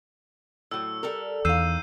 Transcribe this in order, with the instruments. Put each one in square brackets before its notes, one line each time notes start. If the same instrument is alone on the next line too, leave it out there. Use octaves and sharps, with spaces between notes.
[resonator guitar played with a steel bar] A2 F#3 [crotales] E6
[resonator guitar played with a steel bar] G3 A4 A#4
[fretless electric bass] E2 [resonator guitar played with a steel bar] D#3 F5 [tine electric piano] E6 [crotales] G6 C7 D#7